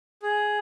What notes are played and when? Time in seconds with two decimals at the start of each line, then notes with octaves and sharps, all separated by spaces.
0.23 G#4